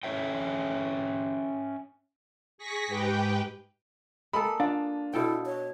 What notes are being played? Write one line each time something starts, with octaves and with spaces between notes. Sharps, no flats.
C#4 C#5 E5 G5
G#4 C#6 A#6 B6
G#2 G4 B4 G5
G#3 A#3 A4 B5
D4 F4
B2 E4 A4 G5
C#5